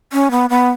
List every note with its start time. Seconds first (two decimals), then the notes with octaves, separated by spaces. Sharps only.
0.13 C#4
0.31 B3
0.50 B3